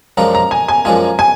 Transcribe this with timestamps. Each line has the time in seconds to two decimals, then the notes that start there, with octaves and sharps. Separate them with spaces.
0.17 F#2 F3 G#3 D4 F4 A#5
0.35 A#5
0.51 G#5
0.68 G#5
0.85 F#2 F3 G#3 D4 F4 G#5
1.19 G#5